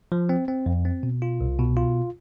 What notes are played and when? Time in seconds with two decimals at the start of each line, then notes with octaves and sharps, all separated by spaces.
0.12 F3
0.29 C4
0.48 C4
0.66 F2
0.85 C4
1.03 B2
1.22 F4
1.41 C2
1.59 B2
1.77 F4